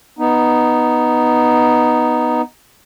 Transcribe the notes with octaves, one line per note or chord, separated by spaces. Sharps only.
B3 D#4